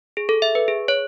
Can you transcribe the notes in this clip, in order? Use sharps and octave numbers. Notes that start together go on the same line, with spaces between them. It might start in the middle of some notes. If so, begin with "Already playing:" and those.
G#4
A4
E5
B4
G#4
C#5